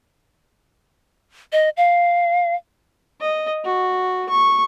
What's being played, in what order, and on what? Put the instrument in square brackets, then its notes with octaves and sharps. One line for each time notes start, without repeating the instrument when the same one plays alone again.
[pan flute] D#5
F5
[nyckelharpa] D#5
F#4
C#6